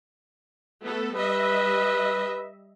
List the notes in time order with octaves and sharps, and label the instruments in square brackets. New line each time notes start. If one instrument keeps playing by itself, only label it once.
[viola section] A3 B3 A4
[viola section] G3 D#5 E5 [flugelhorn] B4